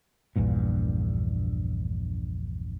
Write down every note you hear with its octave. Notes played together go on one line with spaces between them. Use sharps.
A#1 E2 G2 A#2